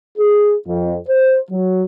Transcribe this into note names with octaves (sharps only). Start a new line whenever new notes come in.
G#4
F2
C5
F#3